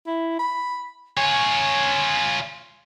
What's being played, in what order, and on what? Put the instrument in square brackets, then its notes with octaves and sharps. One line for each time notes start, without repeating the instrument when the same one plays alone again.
[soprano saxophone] E4
B5
[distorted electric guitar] F4 C#5 [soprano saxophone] G#5